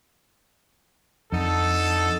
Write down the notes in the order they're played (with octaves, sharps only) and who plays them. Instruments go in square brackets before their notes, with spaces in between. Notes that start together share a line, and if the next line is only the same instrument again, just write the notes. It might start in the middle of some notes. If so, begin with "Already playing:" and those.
[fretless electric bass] F2 [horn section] D3 D#4 A4